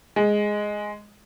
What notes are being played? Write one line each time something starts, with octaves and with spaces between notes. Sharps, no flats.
G#3